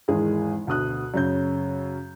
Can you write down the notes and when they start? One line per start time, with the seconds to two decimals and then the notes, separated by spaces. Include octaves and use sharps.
0.08 G#1 E2 G#3 G#4
0.67 D2 B2 D#6 F#6
1.14 F#2 C#3 G6